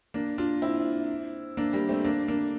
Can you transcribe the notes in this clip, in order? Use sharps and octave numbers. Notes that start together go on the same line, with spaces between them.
A#3 D4
D4 F4
C4 E4
A#3 D4
G3 A#3
A3 C4
A#3 D4
A#3 D4